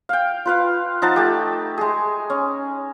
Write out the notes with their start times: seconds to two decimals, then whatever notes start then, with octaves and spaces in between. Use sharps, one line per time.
0.09 F5 G5
0.45 F4 B4 F5
1.02 F3 D#4 F#5 A5
1.16 A3 G4
1.78 G#3 G#4
2.30 C#4